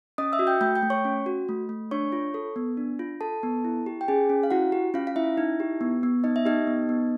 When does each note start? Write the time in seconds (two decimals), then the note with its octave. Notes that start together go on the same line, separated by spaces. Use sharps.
0.18 C#4 D#5 D#6
0.32 E5 E6
0.39 F#4
0.47 G5 G6
0.61 A3 G5 G6
0.76 G5 G6
0.82 A3
0.90 C#5 C#6
1.05 C#4
1.26 F#4
1.49 A3
1.69 A3
1.91 D4 C#5 C#6
2.12 F4
2.34 A4
2.56 B3
2.77 D4
2.99 F4
3.21 A4 A5
3.43 B3
3.65 E4
3.86 G4
4.01 G5
4.08 C#4 G#4 G#5
4.30 C#4
4.43 F5
4.51 E4 F#4 F#5
4.72 G4
4.94 C#4 F4 F5
5.07 F5
5.16 C#4 E4 E5
5.37 D#4
5.60 G4
5.81 B3
6.03 B3
6.24 D#4 D#5
6.36 E5
6.46 D#4 G4 D#5
6.67 B3
6.89 B3